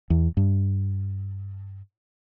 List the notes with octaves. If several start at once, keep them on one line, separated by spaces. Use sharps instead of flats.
E2
G2